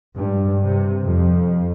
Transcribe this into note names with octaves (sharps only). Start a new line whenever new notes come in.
G2
C3
F2